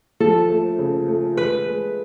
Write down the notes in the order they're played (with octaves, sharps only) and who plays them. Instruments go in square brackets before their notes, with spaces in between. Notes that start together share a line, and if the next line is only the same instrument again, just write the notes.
[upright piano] F3 [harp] A4
[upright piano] A3
C#3
A3
[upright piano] G#3 [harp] B4
[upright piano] G#3